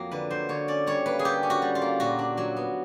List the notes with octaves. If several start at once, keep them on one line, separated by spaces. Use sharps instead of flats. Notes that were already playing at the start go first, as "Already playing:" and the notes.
Already playing: F2 F#3 A#3
D3 B4
F#3 C5
D3 C#5
C#4 D5
G3 C#5
A#3 B4
G#4
D3 G4
C#4
F#4
G3
F4
A#3
A#2 F#4
D4
F#3
B3